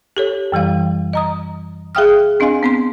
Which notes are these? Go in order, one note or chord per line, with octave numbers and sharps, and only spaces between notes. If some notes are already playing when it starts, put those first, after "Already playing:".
G4 A4 C#5
F#2 E3 G3 F5
D#5 A#5 D#6
G#4 E5 F5 G5 D#6 F6
C4 D4 D#5 F5 G#5 C6
B3 C4 C6